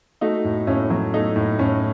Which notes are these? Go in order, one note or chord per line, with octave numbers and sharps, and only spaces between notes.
A3 D#4 F#4
A2
A2 C#4 E4
F#3
A3 D#4
A2
A2 C#4